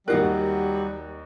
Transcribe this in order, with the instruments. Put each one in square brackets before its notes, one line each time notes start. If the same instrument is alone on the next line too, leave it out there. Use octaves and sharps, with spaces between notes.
[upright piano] D#2 D#4 F#6 [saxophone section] F#3 G3 [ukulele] A#4 F5 F#5